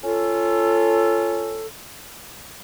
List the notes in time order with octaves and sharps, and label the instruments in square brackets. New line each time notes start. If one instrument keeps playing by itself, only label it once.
[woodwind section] C#4 F4 A4